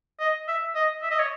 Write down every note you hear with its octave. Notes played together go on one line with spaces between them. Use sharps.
D#5
E5
D#5
E5
D#5
C#5